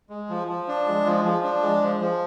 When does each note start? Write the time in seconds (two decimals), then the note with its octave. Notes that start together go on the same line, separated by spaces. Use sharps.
0.10 G#3
0.29 F3
0.48 F3
0.68 D4
0.87 G#3
1.06 F3
1.25 F3
1.44 D4
1.62 G#3
1.82 F3
2.01 F3